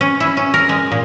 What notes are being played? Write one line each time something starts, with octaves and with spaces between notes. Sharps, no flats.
C#4
E4
C#4
A#4
G#3
A#2